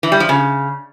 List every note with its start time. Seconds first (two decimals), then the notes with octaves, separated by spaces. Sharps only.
0.03 E3
0.12 G3
0.20 F3
0.29 C#3